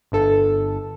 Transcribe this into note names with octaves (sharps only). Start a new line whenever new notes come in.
G1 A4